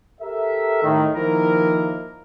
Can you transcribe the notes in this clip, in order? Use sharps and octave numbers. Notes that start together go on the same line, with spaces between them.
G4 A4 A#4 E5
A2 D#3
D#3 F3 A#3 E4 A#4